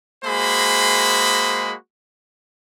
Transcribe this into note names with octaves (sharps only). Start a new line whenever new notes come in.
G#3 A#3 F#4 G#4 C5 B5